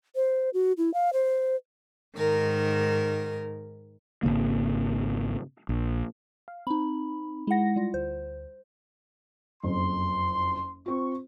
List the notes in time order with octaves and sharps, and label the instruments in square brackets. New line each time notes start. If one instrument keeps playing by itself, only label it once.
[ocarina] C5
F#4
E4
F5
C5
[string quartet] G#2 D#3 A#4
[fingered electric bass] G#1 F#2 C#3 A#3
A#1
[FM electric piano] F5
[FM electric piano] C4 [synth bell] D#4 B5
[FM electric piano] G#3 A#6 [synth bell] E4 F#5
[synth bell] G3 F4
[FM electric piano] D2 [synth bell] C5
[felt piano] F#1 F2 [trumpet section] C6
[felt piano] C4 F4 [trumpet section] C#6